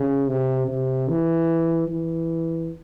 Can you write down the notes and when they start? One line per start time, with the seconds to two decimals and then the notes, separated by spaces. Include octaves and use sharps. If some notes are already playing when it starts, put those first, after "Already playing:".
Already playing: C#3
0.28 C3
0.68 C3
1.09 E3
1.88 E3